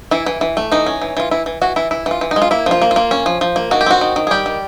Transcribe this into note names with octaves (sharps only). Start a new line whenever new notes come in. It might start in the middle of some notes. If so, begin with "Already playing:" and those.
E3 E4
E3
E3
A3
E3 D#4
C#4
E3
E3 F4
E3 E4
E3
E3 F#4
E3 E4
E3 E4
E3
F4
E3
G#3 D#4
F4
A#3 E4
F3 F4
A#3
F4
A#3
C#4
F3
F3
A#3
D#3 F#4
G4
C4 F#4
D#3
D#3
G#4
G3 G4
D#3